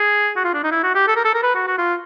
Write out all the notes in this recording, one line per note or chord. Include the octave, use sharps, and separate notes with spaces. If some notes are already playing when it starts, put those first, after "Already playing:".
Already playing: G#4
F#4
F4
D4
D#4
E4
F#4
G4
A4
A#4
A4
A#4
B4
F#4
F#4
F4